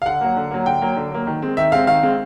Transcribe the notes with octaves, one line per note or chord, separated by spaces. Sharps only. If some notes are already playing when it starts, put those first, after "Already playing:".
F5
D3 F#5
F#3 A#3
D3
F#3 A#3
D3 G5
F#3 A#3
D3
F#3 A#3
D#3
G#3 C4
D#3 E5
G#3 C4 F5
D#3 F5
G#3 C4